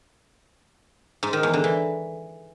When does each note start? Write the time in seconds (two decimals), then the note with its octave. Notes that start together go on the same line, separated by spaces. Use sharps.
1.23 G#2
1.33 D#3
1.43 E2
1.54 D3
1.64 E3